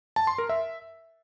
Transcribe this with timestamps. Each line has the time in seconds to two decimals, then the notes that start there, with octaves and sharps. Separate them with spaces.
0.16 A5
0.27 C6
0.38 A#4
0.49 E5